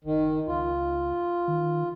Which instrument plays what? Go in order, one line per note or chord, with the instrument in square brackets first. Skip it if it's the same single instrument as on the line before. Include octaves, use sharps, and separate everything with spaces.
[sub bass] F#1 [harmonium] D#3
[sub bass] C#2 [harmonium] F4
[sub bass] D#3